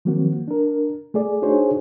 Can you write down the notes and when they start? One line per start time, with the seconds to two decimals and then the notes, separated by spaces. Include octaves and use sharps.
0.05 D#3 F3 F#3 A#3 C4 F#4
0.48 D4 A#4
1.14 A3 G#4 D5
1.42 D4 D#4 F#4 G#4 C5 C#5